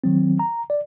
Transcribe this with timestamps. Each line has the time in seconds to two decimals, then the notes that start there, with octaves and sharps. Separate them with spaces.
0.04 D#3 F#3 C4
0.39 A#5
0.70 D5